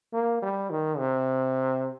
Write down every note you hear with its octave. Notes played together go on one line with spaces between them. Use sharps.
A#3
G3
D#3
C3